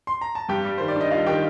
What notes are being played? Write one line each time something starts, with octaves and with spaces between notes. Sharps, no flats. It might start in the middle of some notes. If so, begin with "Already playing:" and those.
C6
A#5
A5
G2 G4 G5
G3
D#3 C5
D5
D4 D#5
G3 F4 F5
D#3 G4 G5